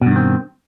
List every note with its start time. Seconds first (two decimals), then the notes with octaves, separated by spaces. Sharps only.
0.01 B2
0.06 G2
0.11 D#3
0.16 C4